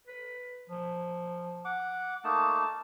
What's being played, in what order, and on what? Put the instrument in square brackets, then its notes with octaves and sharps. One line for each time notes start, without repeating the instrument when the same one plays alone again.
[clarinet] B4
F3
[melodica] F#5 D6
[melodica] A3 A#3 D#4 [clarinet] A5